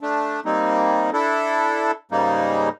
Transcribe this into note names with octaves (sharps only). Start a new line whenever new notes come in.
A3 D4
G3 A#3 C4 D#4
D4 E4 A4
G#2 C#3 G3 A#3 D#4